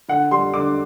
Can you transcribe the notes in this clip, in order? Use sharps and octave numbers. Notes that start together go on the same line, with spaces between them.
D3 F#5
G3 C6
D3 D6